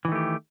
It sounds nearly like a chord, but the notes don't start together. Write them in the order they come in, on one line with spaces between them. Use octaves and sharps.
E3 D#3 A3 G4